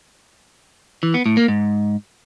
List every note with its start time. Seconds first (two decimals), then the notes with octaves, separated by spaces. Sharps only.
1.03 E3
1.14 B3
1.26 A2
1.37 A#3
1.48 G#2